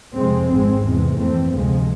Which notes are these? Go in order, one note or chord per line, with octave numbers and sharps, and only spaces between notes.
F2 C3 G#3 C4
G#1 G#2 G#3 C4
E2 C3 G#3
F2 E3 A3 C4
D2 C3 F3 G#3